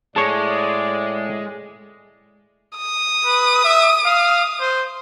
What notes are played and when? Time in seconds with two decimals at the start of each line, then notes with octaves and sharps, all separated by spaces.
0.16 A2 G#3 C#5 D5 A5
2.77 D#6
3.25 B4
3.64 E5
4.05 F5
4.60 C5